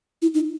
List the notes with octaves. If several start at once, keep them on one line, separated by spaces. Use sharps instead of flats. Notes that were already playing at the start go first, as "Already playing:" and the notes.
E4
D#4